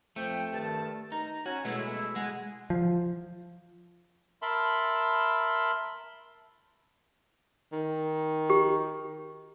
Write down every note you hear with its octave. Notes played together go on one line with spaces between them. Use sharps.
F2 F3 A3 G5
G2 D#3 A5
D#4 A#5
C#4 F#4 G#5
B2 G#3 A3 E4
G#3 F#5 G#5
F3
A#4 E5 A5 B5 C6
D#3
G4